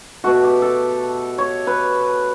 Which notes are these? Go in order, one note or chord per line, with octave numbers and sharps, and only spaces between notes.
B2 A3 F#4
G4
A4
C#5
B4